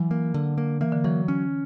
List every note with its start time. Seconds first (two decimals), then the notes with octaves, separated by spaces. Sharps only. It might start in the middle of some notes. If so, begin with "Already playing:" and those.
Already playing: E3 F#3
0.11 A#3
0.34 D3
0.58 A#3
0.81 E3 A#3
0.92 D3
1.04 E3 F#3
1.28 C#4